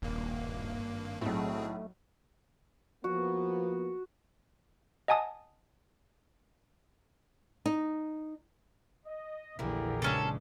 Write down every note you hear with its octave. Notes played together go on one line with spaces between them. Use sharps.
D#1 G#1 G2 A#3
B1 A2 A3 C4 G#4
F3 A#3 B3 F#4
D#5 F#5 G#5 A5 D#6
D#4
D#5
A#1 E2 D3 E3 E4 G4 G#4 A#4
C#3 G#3 C#4 D4 A4